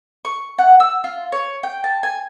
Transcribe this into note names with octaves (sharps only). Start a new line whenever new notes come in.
C#6
F#5
E6
F4
C#5
G5
A5
G#5